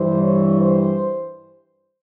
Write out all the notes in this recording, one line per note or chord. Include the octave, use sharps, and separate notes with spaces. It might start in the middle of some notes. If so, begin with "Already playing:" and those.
Already playing: G2 E3 G3 C5
C#5
C5